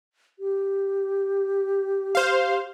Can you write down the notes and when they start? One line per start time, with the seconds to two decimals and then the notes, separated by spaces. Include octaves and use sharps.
0.39 G4
2.15 C5 F5